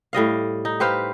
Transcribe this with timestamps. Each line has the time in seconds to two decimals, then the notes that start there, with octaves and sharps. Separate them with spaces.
0.13 A2 G3 D#5 F5
0.65 D#4
0.80 G4 B4 C5 F5